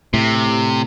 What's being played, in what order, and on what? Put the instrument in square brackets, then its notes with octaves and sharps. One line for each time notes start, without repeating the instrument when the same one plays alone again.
[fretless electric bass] A2 [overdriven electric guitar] C3